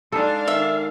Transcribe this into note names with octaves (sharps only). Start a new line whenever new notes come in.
G#3 D4 D#4 A4 F5
D#3 E5